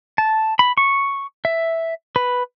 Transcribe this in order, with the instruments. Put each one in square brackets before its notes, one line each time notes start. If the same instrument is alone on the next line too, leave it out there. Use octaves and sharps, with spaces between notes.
[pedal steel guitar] A5
B5
C#6
E5
B4